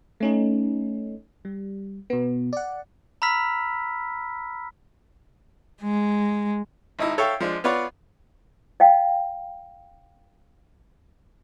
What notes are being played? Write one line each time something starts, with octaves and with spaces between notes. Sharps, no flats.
A3 C#4 D#4
G3
B2 B3
D5 F#5
A#5 B5 E6 F6 B6
G#3
G#1 D#4 E4
A4 C#5 E5 F5 G5
F3 G#3 D4
B3 F4 B4 C#5 D5 F#5
D#5 F5 G5